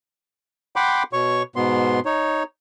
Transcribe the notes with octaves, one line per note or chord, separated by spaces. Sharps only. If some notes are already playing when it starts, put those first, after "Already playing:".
F#5 G5 B5 C6 D6
B2 C#5 C#6
G#2 B2 B3 C6
D#4 C#5